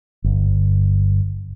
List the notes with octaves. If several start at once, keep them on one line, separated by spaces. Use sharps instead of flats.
G1